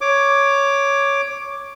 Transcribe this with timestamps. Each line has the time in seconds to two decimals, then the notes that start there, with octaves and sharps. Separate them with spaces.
0.01 C#5 D6